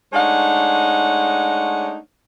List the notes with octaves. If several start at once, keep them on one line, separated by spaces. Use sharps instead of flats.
G#3 A3 D4 D#4 C#5 F#5